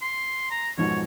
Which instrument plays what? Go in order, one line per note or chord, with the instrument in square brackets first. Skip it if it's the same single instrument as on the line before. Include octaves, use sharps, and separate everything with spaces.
[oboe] C6
A#5
[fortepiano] F2 G#2 B2 [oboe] C#5